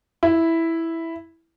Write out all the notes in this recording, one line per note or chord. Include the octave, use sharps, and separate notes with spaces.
E4